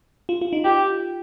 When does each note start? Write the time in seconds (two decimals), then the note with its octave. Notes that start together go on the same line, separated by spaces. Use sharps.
0.29 F4
0.41 F4
0.53 D#4
0.65 F4 G4